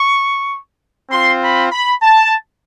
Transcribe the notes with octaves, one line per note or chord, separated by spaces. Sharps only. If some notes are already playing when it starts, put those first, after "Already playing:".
Already playing: C#6
C4 F4 C6
B5
B5
A5